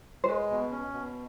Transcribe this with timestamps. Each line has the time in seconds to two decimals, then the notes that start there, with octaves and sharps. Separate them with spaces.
0.24 C5
0.28 G#3 B4
0.50 B2
0.71 C#4
0.93 B2